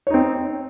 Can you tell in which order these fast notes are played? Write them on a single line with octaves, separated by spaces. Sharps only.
C#5 D#4 C4